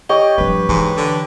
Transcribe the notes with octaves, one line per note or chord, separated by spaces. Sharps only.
G4 C#5 D#5
G2 F3 B4
G#2 E3
D3